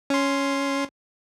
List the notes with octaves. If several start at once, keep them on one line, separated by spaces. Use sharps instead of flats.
C#4 C6